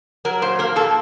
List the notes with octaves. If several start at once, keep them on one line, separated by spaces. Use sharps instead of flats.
F#3 A#4
A#2 C5
A#3 A#4
A#2 A4